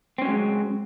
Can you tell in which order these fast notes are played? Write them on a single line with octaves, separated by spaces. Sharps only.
C4 C#4 F#3 G#3